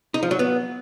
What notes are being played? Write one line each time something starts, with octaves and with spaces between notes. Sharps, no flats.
D#4
F3
F#3
B3